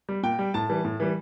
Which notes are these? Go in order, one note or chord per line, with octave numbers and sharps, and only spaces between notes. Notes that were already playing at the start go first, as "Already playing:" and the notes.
G3
A#2 G5
G3
A2 A5
E3 G3
A2
E3 G3